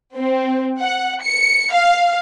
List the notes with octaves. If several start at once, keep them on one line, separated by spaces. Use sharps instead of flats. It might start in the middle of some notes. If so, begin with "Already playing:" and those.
C4
F#5
C#7
F5